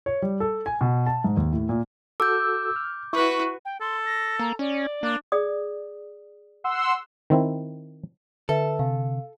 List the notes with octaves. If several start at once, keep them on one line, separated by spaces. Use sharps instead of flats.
C#5
G3
A4
G#5
B2
A5
G#2
D#2
A2
A#2
F#4 A4 D6 E6 G6
F6
E4 F#4 B4 C#6
G5
A4 C6
A#6
A#3 A#5
C#4 D5
A#3 D4
G#4 D5 D#6
F#5 C6 E6
D#3 C4 E4
D3 A4 B4 E5
C3 F5